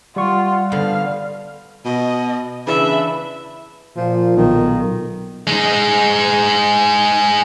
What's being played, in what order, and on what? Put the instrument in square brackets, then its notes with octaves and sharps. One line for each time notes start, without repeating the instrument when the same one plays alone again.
[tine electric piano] G3 C#6 [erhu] F4 [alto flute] F#5
[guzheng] D3 B3 C5 [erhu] F5
[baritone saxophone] B2 [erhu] D#5
[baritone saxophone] C#3 [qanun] E3 D4 [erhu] E5 [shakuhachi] B5
[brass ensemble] A#2 [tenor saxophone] F3
[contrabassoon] B1 [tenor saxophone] D#3
[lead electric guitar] G#3 D#4